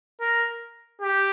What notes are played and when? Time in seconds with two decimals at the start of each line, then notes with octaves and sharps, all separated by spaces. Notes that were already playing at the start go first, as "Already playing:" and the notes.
0.21 A#4
1.02 G4